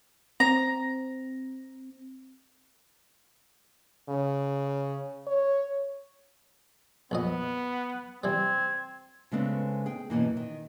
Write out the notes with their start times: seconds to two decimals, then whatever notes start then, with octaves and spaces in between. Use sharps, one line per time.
0.40 C4 A#5
4.09 C#3
5.27 C#5
7.11 A#1 F2 B3 D#5
8.24 C3 E3 G3 C4 G#6
9.32 C#3 G#3 A3 B3 C4 D4
9.86 G#4 G5
10.10 F#2 B2 E3 A#3
10.37 D#3